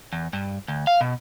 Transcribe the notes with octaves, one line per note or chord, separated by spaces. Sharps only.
E2
G2
D2
F5
B2